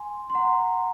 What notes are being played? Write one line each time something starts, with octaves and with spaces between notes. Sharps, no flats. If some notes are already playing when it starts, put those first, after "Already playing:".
Already playing: G#5 C6
C6
F#5 A#5